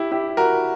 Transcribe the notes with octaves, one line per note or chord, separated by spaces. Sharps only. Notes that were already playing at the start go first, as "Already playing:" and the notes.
Already playing: E4 G4
E4 G4
F#4 A#4